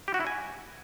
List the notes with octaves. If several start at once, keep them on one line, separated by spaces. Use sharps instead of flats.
G4
F#4
E4
G#5